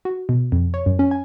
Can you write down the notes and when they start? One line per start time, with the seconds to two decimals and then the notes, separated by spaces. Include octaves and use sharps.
0.05 F#4
0.29 B2
0.52 F2
0.74 C#5
0.86 F#2
0.99 C#4
1.11 G#5